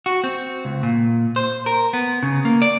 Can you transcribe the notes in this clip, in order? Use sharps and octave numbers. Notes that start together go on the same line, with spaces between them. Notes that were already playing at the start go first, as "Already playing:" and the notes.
F#4
C4
C#2
A#2
C5
A#4
B3
C#3
A#3
D5